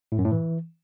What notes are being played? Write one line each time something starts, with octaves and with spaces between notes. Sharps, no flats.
A2
F#2
A2
E3